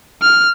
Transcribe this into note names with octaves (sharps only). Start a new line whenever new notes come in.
F6